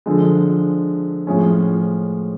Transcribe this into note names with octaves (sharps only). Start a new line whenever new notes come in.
D3 F3 G#3
A2 F3 G#3 C#4